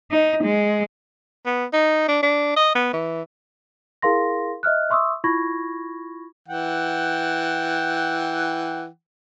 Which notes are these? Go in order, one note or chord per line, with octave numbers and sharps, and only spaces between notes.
D#4
G#3
B3
D#4
D4
D4
D#5
B3
E3
E4 G#4 A#4 F5 C6 A#6
D#5 E5 F6 F#6
E5 C6 C#6 D#6 E6
E4 F4 B5 C#6 G#6 A#6
E3 F#5 G5